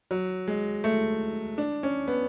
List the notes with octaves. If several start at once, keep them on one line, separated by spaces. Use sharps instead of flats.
F#3
G#3
A3
D4
C#4
B3